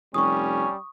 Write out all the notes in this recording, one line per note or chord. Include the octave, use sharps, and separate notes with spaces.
F1 G3 C#4 C#6 D#6